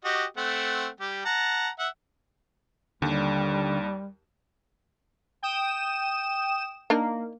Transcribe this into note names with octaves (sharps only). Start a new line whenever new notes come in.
F#4 G4 D#5
A3 C4 F#5
G3 G4
F#5 A5 A#5
E5 F#5
D#2 D3 G3
G5 D#6 E7
A#3 D4 D#4 A#4